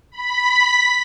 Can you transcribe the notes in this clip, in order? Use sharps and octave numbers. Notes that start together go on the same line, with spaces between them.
B5 B6